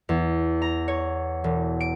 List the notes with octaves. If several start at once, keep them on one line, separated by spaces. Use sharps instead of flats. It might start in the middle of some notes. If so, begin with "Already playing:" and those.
E2
A#5
C#5
E1
D7